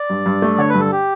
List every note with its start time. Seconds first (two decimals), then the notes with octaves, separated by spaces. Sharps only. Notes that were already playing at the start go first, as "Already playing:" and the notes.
Already playing: D5
0.10 G2
0.26 G2
0.42 A3
0.58 D3 C#5
0.69 G2 B4
0.80 A4
0.92 G4